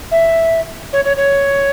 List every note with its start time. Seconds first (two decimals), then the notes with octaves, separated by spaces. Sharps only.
0.11 E5
0.93 C#5
1.05 C#5
1.17 C#5